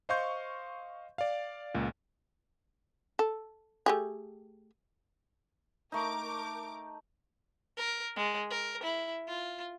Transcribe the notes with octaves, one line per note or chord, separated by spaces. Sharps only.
C5 D#5 F5 C6 C#6 G6
D5 F5
C#2 A#2
A4
A3 G4 G#4
A3 D#4 A#4 D6
A#4
G#3
A#4
E4
F4